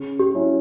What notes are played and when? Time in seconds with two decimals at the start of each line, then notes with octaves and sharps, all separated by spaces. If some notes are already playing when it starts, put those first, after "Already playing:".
Already playing: C#3
0.19 G4
0.34 F#3 C#4 E4